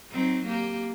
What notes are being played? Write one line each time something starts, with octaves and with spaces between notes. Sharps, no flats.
F#3 C4 D#4
A#3 G4